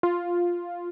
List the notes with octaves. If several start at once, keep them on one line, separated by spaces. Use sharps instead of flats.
F4